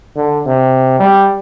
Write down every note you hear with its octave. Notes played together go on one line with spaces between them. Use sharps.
D3
C3
G3